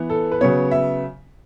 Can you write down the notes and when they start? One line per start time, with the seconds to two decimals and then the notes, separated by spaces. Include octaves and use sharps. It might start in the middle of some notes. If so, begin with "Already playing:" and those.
Already playing: E3 B3
0.10 A4
0.32 B4
0.41 C#3 F#3 B3 C#5
0.71 E5